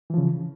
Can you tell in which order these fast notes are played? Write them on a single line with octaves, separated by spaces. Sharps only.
E3 F3 C#3